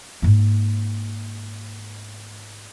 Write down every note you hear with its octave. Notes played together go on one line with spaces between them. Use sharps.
G#2 A#3